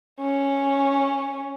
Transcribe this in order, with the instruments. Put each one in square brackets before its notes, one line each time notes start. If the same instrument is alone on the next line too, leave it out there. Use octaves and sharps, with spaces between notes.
[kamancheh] C#4